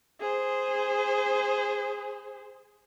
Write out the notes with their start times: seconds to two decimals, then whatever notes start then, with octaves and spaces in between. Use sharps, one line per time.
0.20 G#4 C5